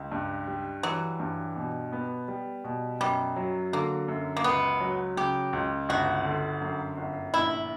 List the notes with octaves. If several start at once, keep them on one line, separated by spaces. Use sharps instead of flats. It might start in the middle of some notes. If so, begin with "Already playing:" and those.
Already playing: C#2
G2
G3
E3 F#3
G2
B2
B3
G3
B2
F#2 G3
F#3
D3 A#3
F#2
A#3
C#2 B3
F#3
C#3 G4
C#2
G1 F#4
D3
F#2
G1
A#1 E4